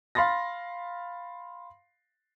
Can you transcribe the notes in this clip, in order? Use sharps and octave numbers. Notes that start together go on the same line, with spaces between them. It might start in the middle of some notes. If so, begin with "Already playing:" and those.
F5 B5 C6 A6 A#6